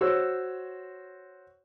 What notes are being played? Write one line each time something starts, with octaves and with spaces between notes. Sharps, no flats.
F#4 C5 C#5 E6